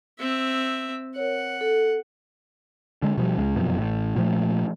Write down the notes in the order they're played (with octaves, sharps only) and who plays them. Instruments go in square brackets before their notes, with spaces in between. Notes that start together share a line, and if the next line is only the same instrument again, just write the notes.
[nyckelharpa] C4 E5
[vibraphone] A#4 C#5 [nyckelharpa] F#5
[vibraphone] A4
[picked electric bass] D3 G#3
B2 F3 G3
C#2 G#3
F1 F#2 B2 F3
A1 A2
A#2 F3 A3